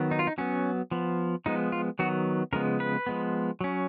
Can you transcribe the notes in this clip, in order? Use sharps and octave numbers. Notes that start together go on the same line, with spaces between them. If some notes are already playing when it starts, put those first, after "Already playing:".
Already playing: D#3 F#3 B3
D#4
F4
D#4
F#3 B3 C#4
F3 B3
F3 G#3 B3 D#4
F4
D#3 F#3 B3 F#4
C#3 F3 G#3 B3 A#4
B4
F3 G#3 B3
F#3 C#4